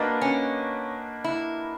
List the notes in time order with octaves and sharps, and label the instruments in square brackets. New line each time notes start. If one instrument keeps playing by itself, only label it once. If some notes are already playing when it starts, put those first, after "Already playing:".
Already playing: [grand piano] A#3 D4 F#4 B4 D#5
[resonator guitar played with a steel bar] C#4
E4